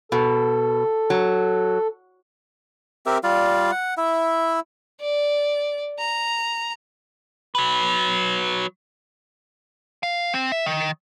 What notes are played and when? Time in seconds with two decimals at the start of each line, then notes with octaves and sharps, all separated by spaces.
0.12 B2 A4
1.10 F#3
3.06 C4 G4 A#4 E5
3.24 G3 F4 D5 F5
3.71 F#5
3.97 E4 E5
5.01 D5
5.99 A#5
7.55 F#3 B4
10.03 F5
10.34 C4
10.52 E5
10.66 D#3